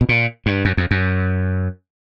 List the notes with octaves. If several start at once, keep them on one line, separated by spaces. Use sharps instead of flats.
B2
A#2
G2
F#2
F2
F#2